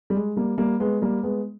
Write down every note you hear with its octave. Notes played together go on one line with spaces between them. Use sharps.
G3
G#3
G3 A#3
G3 A#3
G#3 B3
G3 A#3
G#3 B3